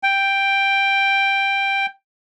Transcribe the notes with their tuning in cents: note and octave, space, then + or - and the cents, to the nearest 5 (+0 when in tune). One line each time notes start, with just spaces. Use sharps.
G5 +5